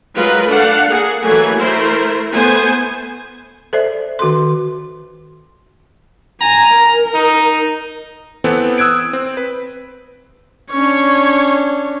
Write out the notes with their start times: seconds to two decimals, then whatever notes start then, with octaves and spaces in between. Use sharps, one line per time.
0.15 F#3 G#3 F4 A#4 B4
0.48 A3 D4 A4 F5 F#5
0.88 A#3 G#4 F#5
1.23 E3 F#3 A3 A#3 G#5
1.58 A3 E4 A#4 C5
2.33 A3 B3 C5 G#5
3.73 A4 C5 D5 E5
4.19 D#3 F#4 A4 C6
6.41 G#5 A#5
6.74 A#4
7.15 D#4
8.44 E3 B3 C4 A4
8.78 D#6 E6 F#6 G#6 D7
9.13 C4
9.37 B4
10.72 C#4 D4 C#5